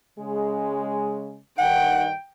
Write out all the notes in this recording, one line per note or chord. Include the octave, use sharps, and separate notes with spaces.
C#3 G#3
G2 D#3 F#5 G5